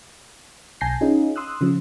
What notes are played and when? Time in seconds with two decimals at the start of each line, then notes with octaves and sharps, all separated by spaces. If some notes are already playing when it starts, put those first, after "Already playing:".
0.81 B1 G#5 A5 G6 A#6 C7
1.01 C#4 D#4 F4 G#4
1.36 C6 D#6 E6 F#6
1.61 C#3 F3